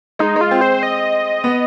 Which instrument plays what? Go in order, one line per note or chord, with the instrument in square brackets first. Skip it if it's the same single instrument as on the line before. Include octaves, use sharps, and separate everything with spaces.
[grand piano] G#3 [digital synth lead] D#4
[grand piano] G#3
[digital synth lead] F4
[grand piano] C4
[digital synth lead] C5
D#5
[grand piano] B3